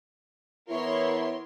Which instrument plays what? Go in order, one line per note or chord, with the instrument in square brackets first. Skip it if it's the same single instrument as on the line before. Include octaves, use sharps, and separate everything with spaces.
[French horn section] E3 B3 E4 [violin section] A#4 C#5 C6